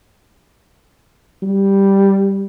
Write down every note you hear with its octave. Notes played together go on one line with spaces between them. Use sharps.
G3